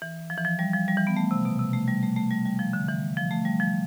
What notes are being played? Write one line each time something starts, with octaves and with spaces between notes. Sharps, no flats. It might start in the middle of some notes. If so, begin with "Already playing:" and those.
E3
F3
E3
F3
G3
F3
G3
E3
B3
A3
C3
B2
C3
A3
G3
A3
A3
G3
G3
F3
D3
E3
F3
A3
G3
F3